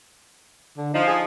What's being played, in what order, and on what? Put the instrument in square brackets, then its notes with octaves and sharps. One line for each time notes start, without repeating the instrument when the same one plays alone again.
[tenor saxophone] D3
[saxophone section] F3 [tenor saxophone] D#4
[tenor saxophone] G#4